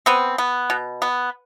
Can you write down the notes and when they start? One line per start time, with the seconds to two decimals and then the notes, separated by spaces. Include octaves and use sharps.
0.06 B3 C4
0.38 B3
0.70 B2
1.02 B3